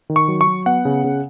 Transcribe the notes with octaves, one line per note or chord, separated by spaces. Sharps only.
D#3
C#6
F#3
C#6
F#3
B3 F#5
C#3
C#3